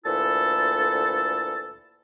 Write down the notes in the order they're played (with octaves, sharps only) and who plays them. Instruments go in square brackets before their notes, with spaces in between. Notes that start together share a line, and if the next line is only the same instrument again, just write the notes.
[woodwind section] D2 A#2 E3 E4 A4 A5